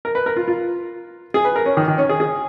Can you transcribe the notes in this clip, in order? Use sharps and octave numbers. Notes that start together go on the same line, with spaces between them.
A#4
B4
A#4
F4
F4
G#4
B4
A#4
C#4
D#3
D#3
C#4
G#4
G#4